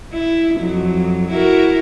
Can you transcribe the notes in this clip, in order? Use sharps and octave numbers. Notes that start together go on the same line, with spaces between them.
E4
F2 F#3
E4 F#4 A#4